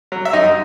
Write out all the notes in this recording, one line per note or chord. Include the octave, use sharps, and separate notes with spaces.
F#3
E5
F#2 D#4 D#5